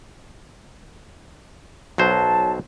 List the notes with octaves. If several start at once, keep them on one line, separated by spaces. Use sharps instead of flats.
B1 F#3 C5 A5